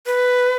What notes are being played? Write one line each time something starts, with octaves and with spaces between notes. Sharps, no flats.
B4